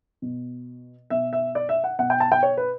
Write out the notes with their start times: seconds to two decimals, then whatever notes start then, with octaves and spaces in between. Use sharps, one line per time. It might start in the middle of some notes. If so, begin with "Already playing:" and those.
0.22 B2
1.10 B2 E5
1.33 E5
1.55 D5
1.69 E5
1.84 F#5
1.99 B2 F#5
2.10 G5
2.20 A5
2.32 G5
2.43 C#5
2.57 B4